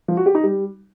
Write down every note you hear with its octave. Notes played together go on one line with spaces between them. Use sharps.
F3
F#4
G4
D#4
G3